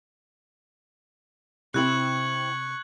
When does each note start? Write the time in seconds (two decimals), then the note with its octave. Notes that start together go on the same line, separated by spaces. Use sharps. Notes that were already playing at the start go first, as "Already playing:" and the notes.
1.74 C3 C4 E4 G4 C#6 F#6 G#6 F#7